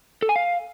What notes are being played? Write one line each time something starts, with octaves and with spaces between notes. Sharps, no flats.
A4
G#5
F5